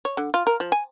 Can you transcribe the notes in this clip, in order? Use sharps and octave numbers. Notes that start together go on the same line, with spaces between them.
C#5
D3
F4
A#4
F3
G#5